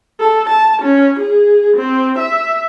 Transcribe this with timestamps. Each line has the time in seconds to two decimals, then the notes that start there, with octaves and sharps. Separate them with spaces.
0.20 A4
0.49 A5
0.82 C#4
1.19 G#4
1.77 C4
2.19 E5